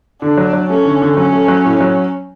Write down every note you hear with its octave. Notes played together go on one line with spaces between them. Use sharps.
D3 D4
F#3
F#3
A3 C#4
D3
D3
F#3 C#4
A3
F#3
A2
F#3